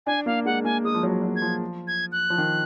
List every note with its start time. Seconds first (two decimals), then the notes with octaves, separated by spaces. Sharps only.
0.07 D4 G#5
0.26 A#3 F5
0.46 G#3 F#5
0.64 A#3 G#5
0.84 G#3 D#6
0.95 F3
1.03 F#3
1.22 F#3
1.36 G#6
1.42 F3
1.87 G#6
2.12 F#6
2.30 F3
2.38 D#3